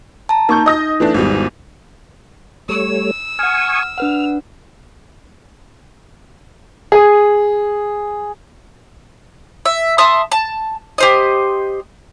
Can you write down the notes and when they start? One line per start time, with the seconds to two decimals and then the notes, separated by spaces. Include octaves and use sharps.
0.29 A5 A#5
0.49 A#3 D#4 C#6 G6
0.66 D#5 D#6 A#6
1.00 E3 A3 D4
1.14 G#1 E2 G3
2.69 G3 A3 C#5 E6
3.39 F#5 G#5 C#6 D#6 F6
3.98 D4 B4 F#5 F6
6.92 G#4
9.65 E5
9.98 E5 A5 C6 D#6
10.32 A5
10.98 G4 C5 D#5